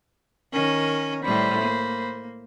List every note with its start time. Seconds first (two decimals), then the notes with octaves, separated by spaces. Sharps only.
0.52 D#3 C#4 A#4
1.24 A2 G3 C5 B5
1.61 A#3